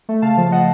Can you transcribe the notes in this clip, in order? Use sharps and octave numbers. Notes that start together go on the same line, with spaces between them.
A3
C#3 F5 A5
F3
D#5 F#5